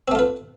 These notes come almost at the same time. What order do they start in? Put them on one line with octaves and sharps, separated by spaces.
C4 A3 F4 B4